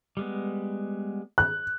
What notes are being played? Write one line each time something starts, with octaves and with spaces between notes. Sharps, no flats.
G3 G#3 B3
F#6